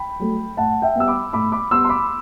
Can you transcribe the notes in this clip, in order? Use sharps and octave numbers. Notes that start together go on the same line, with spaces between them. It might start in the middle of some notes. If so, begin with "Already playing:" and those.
Already playing: G5 B5
F#3 A3
A2 F#5 A5
E5 G5
G3 B3 E6
B5 D6
A2 B5 D6
B5 D6
G3 B3 C6 E6
C6
B5 D6